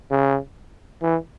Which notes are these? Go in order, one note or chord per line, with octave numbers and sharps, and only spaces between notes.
C#3
E3